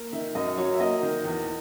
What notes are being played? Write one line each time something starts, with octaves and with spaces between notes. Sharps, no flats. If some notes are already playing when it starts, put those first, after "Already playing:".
Already playing: A#3
D#3 E5
F#2 D#5
F#3 C#5
E5
A#3 D#5
D#3
E2